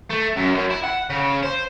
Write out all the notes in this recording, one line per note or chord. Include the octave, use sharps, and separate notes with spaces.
A3
F#2
F#2
E4
F#5
C#3
C5